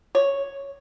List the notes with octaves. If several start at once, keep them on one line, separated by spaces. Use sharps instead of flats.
C#5